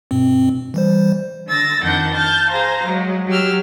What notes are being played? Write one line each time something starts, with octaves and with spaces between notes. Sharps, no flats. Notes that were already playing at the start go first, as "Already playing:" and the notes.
G2 B2 C4
E3 G3 C5
D3 E6 A6 A#6
F2 D#3 D4 F#5 G6
A5 F6 G6
G#4 C5 F5 A#5
F#3 G#3
F#3 G4 E6 F6